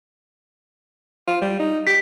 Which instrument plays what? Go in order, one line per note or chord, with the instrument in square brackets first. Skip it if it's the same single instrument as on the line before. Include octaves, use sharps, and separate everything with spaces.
[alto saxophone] F4
G3
D#4
[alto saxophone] G4 [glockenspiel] B6